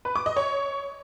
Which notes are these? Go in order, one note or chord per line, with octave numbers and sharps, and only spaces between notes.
B4
D6
D#5
C#5